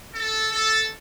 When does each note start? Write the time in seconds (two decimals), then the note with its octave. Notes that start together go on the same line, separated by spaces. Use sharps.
0.13 A4
0.50 A4